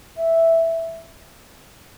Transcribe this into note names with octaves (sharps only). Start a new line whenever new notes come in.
E5